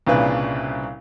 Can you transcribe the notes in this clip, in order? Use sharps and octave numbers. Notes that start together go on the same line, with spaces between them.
C2 A#2 C#3 D4 B4